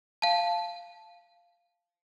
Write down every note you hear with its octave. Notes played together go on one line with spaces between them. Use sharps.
F5 A5